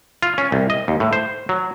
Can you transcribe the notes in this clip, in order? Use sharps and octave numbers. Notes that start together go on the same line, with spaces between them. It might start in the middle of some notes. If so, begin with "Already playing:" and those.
F4
C#4
C2
D#5
D#2
A2
C5
F#3